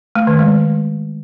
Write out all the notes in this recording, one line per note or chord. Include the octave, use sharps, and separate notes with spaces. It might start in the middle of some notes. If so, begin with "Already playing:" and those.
A3
D#3
G#3